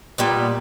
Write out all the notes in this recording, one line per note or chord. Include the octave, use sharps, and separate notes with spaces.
A#2 G3 B3